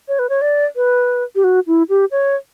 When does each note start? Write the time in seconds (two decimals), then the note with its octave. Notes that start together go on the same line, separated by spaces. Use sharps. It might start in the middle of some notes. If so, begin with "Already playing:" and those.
0.08 C#5
0.19 B4
0.29 C#5
0.41 D5
0.76 B4
1.35 G4
1.44 F#4
1.67 E4
1.89 G4
2.11 C#5